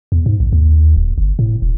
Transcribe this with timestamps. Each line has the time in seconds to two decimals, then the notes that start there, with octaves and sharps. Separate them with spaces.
0.12 E2
0.26 G#2
0.40 A#1
0.53 D#2
0.96 D1
1.18 G1
1.39 A2
1.62 D#1